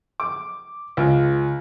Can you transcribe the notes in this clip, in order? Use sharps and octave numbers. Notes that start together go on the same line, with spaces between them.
D6
C#2